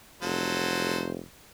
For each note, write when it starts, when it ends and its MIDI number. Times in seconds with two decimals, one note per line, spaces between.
0.22 1.21 29
0.22 1.08 54
0.22 1.08 69
0.22 1.08 72